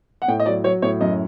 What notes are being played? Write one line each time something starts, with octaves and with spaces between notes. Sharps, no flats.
F#5
A2 G5
D#5
F#3 D5
F#3 C#5
A2 C#5
F#2 D#5